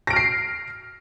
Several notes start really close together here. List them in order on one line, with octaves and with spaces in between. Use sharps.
A#6 D7 F6 C7